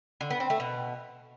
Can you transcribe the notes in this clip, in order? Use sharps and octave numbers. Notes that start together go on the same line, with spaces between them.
D3
B3
C4
A3
B2